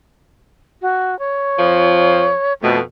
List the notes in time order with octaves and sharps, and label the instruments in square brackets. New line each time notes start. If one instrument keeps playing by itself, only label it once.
[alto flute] F#4
C#5
[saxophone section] F2 F3
[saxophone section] F2 B2 [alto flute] A3